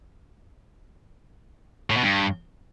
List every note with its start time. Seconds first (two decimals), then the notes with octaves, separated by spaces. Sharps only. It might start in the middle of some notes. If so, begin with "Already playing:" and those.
1.90 A2
1.97 B2
2.03 G2